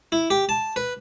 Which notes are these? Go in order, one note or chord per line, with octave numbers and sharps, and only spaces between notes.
E4
G4
A5
B4